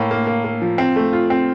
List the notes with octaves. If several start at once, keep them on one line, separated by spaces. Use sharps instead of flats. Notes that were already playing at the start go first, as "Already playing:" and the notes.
Already playing: A2 A#3
A#3
A#3
A#3
F3
C4
A3
F4
C4